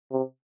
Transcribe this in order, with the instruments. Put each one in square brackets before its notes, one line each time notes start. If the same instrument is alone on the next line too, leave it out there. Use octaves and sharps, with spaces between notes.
[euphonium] C3